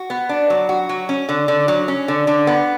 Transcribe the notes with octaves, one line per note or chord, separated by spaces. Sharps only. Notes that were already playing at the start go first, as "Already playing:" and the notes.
Already playing: F#4
B3
D4
F#3
F#4
F#3
C#4
D3
D3
F#3
C#4
D3
D3
B3